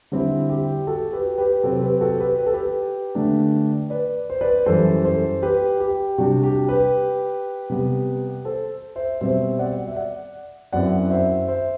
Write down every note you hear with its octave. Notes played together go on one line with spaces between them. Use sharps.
D3 G3 C4 E4
G4
F#4 A4
G4 B4
G4 B4
C3 F#3 C4 F#4 A4
G4 B4
F#4 A4
G4 B4
B4
A4
G4 B4
D3 A3 D4
B4 D5
C5
B4 D5
F#2 E3 G3 A4 C5
A4 C5
G4 B4
G4
C3 G3 D4 F#4
G4
G4 B4
C3 G3 B3
A4 C5
C5 E5
B2 G3 C4 C5 E5
D5 F#5
E5
D5 F#5
F#2 F#3 C4 E4 D5 F#5
C5 E5
C5 E5